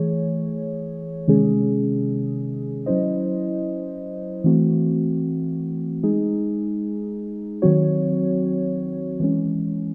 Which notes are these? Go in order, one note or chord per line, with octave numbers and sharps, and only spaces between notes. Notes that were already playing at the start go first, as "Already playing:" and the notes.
Already playing: E3 A3 G#4 C#5
C3 D#3 G#3 C#4 G#4
F#3 C#4 E4 C5 D#5
E3 A3 C4 F#4
G#3 D#4 G#4
D#3 F#3 C4 F#4 C#5
E3 G#3 C#4